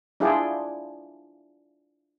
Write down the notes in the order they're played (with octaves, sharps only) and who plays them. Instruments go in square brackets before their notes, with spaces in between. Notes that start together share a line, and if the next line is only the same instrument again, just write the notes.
[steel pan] D4 E4 F4 G#4 D5 G5